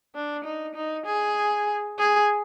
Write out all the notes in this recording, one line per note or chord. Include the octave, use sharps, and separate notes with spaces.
D4
D#4
D#4
G#4
G#4